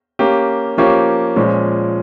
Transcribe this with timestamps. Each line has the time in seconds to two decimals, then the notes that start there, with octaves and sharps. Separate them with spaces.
0.19 A#3 C#4 G4
0.78 F3 A#3 C#4 G4 C#5
1.36 A#2 F3 G#3 C#4